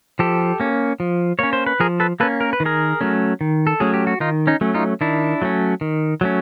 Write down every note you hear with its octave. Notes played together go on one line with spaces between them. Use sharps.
F3 G4 A4
A#3 C#4
F3
A#3 C#4 C#5
C5
B4
F3 G#4 A#4
A4 B4
A#3 C#4 A4 B4
A#4
B4
D#3
G#4 A#4
F#3 A3 C#4
D#3
A4
F#3 A3 C#4 G#4
G4
F#4
D#3 D#4 F4
C#4 D#4
F#3 A3 C#4
D#4 F4
D#3 D4 E4
F#3 A3 C#4
D#3
F#3 A3 C#4